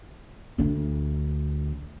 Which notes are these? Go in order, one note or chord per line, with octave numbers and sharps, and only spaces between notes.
D2 D4